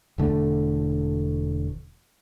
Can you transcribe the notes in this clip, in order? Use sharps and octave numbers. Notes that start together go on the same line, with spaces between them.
E1 D3 A3